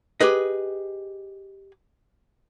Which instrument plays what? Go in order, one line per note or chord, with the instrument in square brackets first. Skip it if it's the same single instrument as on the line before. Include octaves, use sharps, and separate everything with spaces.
[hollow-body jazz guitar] G4 G#4 B4 D#5